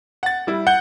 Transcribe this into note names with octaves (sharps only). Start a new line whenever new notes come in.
F#5 A6
G3 E4
F#5 G6 G7